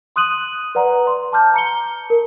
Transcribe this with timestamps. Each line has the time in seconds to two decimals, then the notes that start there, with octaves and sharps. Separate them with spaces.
0.16 C6 D#6 F#6 D#7 F#7
0.75 B4 D5 F#5 A#5
1.07 C6
1.33 A5 D6 F6 G6
1.54 A#5 C#7 G7
2.10 A#4